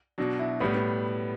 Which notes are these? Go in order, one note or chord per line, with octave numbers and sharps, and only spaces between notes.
B2 F#3 D4
E4
A2 G3 B3
B3